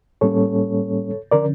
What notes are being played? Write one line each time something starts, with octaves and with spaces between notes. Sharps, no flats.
A2 G3 A#3 C#4 A4 C#5
D3 F3 C#4 A#4 D5